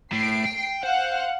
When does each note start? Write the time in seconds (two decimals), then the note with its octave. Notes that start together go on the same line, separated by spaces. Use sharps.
0.13 A2 C7 D7
0.46 G5
0.83 C5 F5 F#5